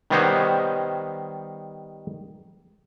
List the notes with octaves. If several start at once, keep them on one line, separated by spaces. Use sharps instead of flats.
D#3 G3 B3 C5 C#5 D#5